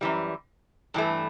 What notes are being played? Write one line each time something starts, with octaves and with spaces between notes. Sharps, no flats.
F#2 E3 G3
G2 E3 A3